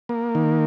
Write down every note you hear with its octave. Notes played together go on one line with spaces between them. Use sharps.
A#3
D#3